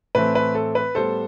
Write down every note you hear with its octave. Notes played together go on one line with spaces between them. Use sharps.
A2 E3 A3 C4 B4
B4
A4
B4
A2 G3 B3 A4 C5